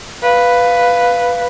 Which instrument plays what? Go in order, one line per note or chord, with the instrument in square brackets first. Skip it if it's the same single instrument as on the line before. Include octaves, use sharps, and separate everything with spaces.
[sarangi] B4 [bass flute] F5